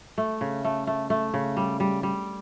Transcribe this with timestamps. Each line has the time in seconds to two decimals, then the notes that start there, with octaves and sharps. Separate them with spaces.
0.18 A3
0.41 C#3
0.64 A3
0.87 A3
1.10 A3
1.34 C#3
1.57 G3
1.80 G3
2.03 G3